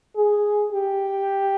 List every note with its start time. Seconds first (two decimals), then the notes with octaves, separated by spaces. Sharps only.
0.16 G#4
0.72 G4